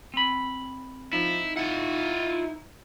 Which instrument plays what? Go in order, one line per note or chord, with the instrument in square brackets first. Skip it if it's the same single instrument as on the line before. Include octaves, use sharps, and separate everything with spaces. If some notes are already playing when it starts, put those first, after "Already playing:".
[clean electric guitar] C4 B5
[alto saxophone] F3 [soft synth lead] D#4 [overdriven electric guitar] E4
[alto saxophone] E4 [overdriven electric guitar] F4 F#5